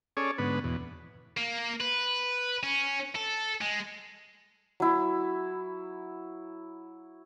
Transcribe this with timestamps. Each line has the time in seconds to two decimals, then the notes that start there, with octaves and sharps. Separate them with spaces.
0.17 C#4 G#4 A4 C#5 D5
0.38 G#2 D3 B3 B4
0.64 E2 B2
1.37 A#3
1.80 B4
2.63 C#4
3.16 A4
3.61 G#3
4.80 F#3 E4